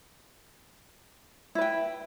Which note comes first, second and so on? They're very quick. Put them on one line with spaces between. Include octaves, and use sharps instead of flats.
E4 B4 G5